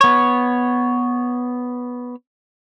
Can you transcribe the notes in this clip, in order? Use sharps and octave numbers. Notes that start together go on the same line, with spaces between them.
B3 C#5